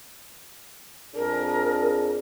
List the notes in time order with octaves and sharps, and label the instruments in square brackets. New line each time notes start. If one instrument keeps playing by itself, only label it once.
[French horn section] F2 D4 G#4 [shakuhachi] A#4